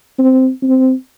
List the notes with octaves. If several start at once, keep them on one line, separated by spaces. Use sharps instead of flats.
C4
C4